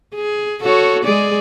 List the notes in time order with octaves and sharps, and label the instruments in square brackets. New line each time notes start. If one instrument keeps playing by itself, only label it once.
[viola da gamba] G#4
F#4 A4 C#5
G#3 G#4 D5